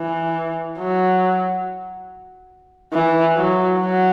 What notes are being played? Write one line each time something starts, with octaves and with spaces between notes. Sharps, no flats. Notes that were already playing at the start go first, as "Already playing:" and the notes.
Already playing: E3
F#3
E3
F#3
F#3